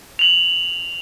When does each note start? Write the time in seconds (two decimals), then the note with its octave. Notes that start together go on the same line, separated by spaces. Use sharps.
0.19 F7 F#7